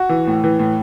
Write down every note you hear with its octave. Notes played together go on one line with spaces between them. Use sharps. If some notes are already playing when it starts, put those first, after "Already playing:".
Already playing: F#4
E3
A2
E3
A2